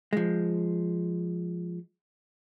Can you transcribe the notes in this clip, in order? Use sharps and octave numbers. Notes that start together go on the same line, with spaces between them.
F3 G#3